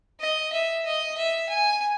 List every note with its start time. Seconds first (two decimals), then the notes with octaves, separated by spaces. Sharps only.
0.20 D#5
0.53 E5
0.85 D#5
1.17 E5
1.49 G#5